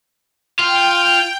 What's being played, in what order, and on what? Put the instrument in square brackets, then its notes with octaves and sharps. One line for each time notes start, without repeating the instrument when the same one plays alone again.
[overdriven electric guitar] F4 [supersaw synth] G5